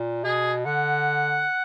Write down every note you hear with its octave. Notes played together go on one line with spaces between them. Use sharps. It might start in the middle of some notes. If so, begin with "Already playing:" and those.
Already playing: A#2
B2 G#4
D3 F#5